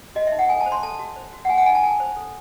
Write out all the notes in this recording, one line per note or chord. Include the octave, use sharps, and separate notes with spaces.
F#4 D#5
E5
D#4
F#5
A4 G#5
A5
C5
C6
A4 A5
F#4
C5
F#4
F#5
F#4 G#5
F#5
D#4 G#5
A5
A4 G#5
C5
A4